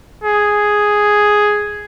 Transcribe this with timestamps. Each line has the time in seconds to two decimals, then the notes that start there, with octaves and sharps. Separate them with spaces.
0.24 G#4